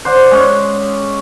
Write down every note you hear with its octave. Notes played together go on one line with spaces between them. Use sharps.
C5 D5 F#5
G#3 C#4